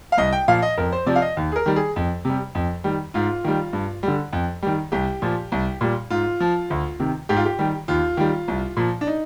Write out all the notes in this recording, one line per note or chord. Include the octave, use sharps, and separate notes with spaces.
F5
C2 D#5
G5
A#2 F3 F5
D#5
F2 A#4
C5
C3 F3 D5
F5
D#5
D#2
G#4
A#4
D#3 G3
G#4
F2
C3 G3
F2
D#3 G3
G#2 F4
D#3 G3
G2
D3 G3
F2
D#3 G3
C2 G4
A#2 F3
C2
A#2 G3
G#2 F4
F3
D2
C3 D#3
G#2 G4
F4
G4
D#3 G3
D#2 F4
D#3 G3
C2
A#2 F3
D4
D#4